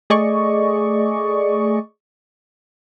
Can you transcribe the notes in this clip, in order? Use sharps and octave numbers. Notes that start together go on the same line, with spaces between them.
A3 G#4 D5 D#5 C#6